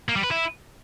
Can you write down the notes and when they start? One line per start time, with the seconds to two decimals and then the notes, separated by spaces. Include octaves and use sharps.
0.09 A#3
0.16 G3
0.24 B4
0.31 E4